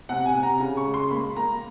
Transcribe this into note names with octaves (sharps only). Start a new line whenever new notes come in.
C3 F#5
G#5
C3
A#5
C#3
C#6
G#3
C6
A#3 B5
A#3 A#5